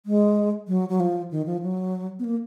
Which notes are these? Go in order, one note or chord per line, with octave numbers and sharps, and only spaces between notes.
G#3
F#3
F#3
F3
D#3
F3
F#3
B3
A#3